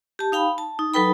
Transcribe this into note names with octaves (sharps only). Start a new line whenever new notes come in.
G4 A5
D#4 F5 G5 B5
A5
D#4
F#3 D#4 A4 B4 G5 B5